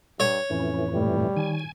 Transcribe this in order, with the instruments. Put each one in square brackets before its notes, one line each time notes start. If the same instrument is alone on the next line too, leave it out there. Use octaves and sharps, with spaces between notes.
[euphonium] G2 [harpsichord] C#5
[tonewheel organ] F2 A2 E3 [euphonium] C#4
[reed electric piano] G2 A#2 A3 [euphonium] G3
[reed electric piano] D#3 [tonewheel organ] G#5